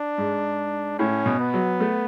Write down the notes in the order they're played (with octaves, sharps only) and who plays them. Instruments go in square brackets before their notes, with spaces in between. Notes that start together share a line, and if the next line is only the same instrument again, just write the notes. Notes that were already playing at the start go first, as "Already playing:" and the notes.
Already playing: [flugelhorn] D4
[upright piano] G#2
[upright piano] A2 [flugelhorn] C#4
[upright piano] B2
[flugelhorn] B3
[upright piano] F#3
A3